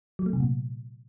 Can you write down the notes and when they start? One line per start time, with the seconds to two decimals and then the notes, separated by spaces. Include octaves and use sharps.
0.19 F#3
0.26 A3
0.33 C3
0.40 A#2